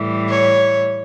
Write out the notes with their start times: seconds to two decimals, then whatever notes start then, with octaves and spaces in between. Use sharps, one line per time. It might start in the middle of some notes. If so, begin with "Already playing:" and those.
Already playing: A2 E3 G3
0.29 C#5